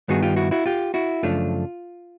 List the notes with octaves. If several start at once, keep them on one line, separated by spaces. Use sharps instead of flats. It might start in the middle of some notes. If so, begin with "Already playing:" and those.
G2 D#3 G3 B3 D#4 F#4 G#4
F4 G4
E4 F#4
E4 F#4
F4 G4
E4 F#4
F#2 C#3 F3 A3 D4 F4